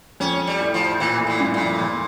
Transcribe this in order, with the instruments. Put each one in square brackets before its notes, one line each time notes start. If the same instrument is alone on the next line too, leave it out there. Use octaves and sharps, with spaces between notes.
[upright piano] F2 [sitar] C#4
[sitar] G3
[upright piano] A2
[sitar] F3
[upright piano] A#2 [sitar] E3
[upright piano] A2
[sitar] A#2
[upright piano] G2
[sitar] A#2
[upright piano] F2
E2